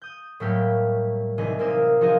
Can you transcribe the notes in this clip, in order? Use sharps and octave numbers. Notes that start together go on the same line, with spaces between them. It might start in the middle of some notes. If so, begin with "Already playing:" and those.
D#6 G6
A2 F#3 G3 A3 A#3 G4
C2 E3 D#4 G#4 D#5 G#5
C2 A#3 C4 A#4 D#6 E7
F3 D#4 F#4 G#4 A#4 D#5